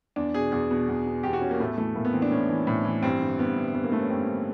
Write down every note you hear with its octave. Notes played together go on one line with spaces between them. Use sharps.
E2 D4
B2 G#4
E2 G#4
B2
E2
B2
E2 G4
F#4
B2 C#4
A#3
A2 A3
E3 A3
A2 A#3
B3
E3 C4
D4
A2 C#4
E3
A2
E3
G2 C4
D3
G2 B3
D3
G2 B3
A#3
D3 A3
C#4
G2 C4
D3